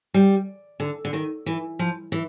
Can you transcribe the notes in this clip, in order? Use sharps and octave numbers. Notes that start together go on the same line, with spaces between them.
G3
D3
D3
D#3
E3
F3
E3